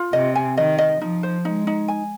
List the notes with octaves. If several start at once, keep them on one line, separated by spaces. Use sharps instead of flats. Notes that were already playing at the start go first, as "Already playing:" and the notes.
Already playing: F4
C3 D#5
G#5
D#3 D#5
D#5
F3 D#4
C5
G#3 D#4
D#4
G#5